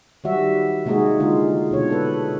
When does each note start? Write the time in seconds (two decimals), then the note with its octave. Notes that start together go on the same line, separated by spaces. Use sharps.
0.24 D#3 F#3 G3 F#4 E5
0.86 C3 G#3 A#3 D#4 F#4 G#4
1.20 D3 G#3 D#4 F4
1.71 B2 D3 C#5
1.89 D4 A4 B4